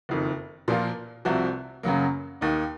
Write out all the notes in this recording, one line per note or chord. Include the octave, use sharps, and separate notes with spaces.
F#1 F2 D#3
A#2 F3 A#3 F4
C2 C3 F3 C4 F#4
F#2 C#3 F#3 A#3
D#2 D#3 A#3 D#4